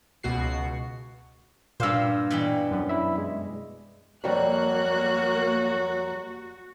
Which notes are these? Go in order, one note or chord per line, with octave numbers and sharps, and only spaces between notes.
C#2 B2 F#4 C7
G2 A#2 C5 F5 E6
B2 E3 G3
F#2
E4 E5
G#3
F2 F#3 G3 A#3 F#4 F#6